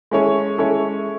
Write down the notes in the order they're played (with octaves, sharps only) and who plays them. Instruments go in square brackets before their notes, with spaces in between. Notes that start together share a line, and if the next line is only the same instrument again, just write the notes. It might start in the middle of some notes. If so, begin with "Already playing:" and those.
[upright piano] G#3 C#4 E4 A4 C#5
G#3 C#4 E4 A4 C#5